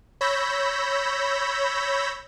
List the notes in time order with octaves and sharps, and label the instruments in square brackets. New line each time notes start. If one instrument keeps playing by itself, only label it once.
[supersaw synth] C#5 B5 E6 G6 A#6